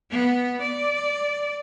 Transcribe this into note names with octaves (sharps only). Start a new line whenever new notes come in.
B3
D5